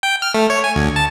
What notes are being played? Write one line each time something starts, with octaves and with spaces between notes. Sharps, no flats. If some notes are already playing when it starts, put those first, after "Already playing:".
G5
F6
A3
C#5
G#5
D2
A5